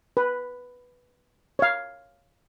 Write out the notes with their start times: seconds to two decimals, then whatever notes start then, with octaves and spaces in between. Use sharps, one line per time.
0.17 B4
1.59 C#5 F5